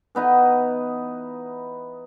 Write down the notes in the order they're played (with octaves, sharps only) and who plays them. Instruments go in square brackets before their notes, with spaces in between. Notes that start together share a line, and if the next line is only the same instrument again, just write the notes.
[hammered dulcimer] E3 B3 D#4 B4